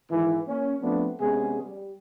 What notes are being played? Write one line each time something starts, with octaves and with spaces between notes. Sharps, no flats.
G#2 D#3 E3
A#3 C#4
F3 A3 B3 C4 D4
C3 G#3 B3 C#4 G#4
G3